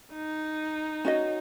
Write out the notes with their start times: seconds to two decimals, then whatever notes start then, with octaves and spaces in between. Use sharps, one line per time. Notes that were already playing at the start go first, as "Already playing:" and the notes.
0.14 D#4
1.05 C#4 F#4 D#5